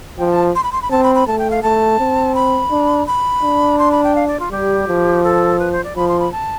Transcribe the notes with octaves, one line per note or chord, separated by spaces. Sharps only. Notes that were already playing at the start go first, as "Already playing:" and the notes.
F3 G5
A5
C6
B5
C6
B5
C4 A5
B5
B5
A3 A5
G5
F5
A3 A5
C4
B5
D4
B5
D4
C6
B5
G5
F5
D5
F4
G3 G4
F3
A4
B4
C5
D5
F3 B5
C6
B5
A5